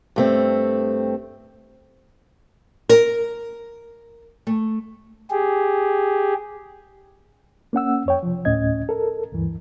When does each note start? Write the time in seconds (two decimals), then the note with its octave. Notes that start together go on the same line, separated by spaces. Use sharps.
0.16 G2 A3 C4
2.89 A#4
4.47 A3
5.30 G4 G#4
7.73 A#3 C#4 F#5 E6
8.06 F2 C#5 G5
8.23 C3 F3
8.45 D2 A2 C#4 D#5 G#6
8.89 A4 A#4
9.31 D2 G2 E3